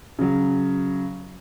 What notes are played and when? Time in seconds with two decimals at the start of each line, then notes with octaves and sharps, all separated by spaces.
0.19 C#3 F#3